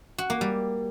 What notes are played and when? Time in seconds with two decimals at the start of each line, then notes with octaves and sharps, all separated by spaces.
0.18 F#4
0.30 A#3
0.41 G3